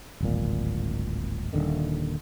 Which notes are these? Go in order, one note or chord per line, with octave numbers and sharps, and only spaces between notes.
D1 G#1 A#2
D#1 D#2 D3 D#3